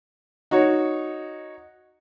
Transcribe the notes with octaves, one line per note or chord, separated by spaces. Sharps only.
D#4 F#4 C#5